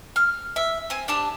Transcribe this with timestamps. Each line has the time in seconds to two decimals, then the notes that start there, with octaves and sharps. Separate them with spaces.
0.16 F6
0.56 E5
0.90 C4 G#5
1.08 D4 G4 A5